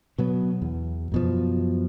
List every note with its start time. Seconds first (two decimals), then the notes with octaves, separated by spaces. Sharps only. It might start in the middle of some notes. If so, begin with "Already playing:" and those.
0.18 B2 F#3 B3
0.62 E2
1.12 F#2 B2 F3